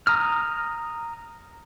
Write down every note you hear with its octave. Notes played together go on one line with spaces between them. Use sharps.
A#5 D#6 F6